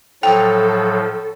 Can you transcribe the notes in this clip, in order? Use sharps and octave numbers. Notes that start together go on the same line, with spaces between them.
A2 F3 F#3 A4 G5